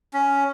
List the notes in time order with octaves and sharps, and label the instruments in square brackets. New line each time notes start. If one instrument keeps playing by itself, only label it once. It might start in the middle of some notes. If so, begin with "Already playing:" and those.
[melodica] C#4